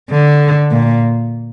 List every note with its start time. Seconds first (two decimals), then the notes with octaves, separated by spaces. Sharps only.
0.10 D3
0.72 A#2